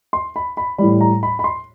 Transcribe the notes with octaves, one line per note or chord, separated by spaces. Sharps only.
C6
B5
B5
A2 E3 G3 B5
A#5
B5
B5
C6